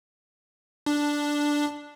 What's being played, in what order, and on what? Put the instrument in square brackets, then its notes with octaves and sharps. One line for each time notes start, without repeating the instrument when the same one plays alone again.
[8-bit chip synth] D4